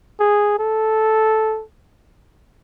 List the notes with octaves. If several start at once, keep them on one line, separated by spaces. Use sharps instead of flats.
G#4
A4